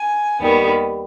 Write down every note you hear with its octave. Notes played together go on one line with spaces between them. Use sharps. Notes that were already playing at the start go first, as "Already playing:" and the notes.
Already playing: G#5
D#2 D#3 G3 B3